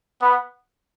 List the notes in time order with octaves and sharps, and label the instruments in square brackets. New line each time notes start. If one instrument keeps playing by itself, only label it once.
[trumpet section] B3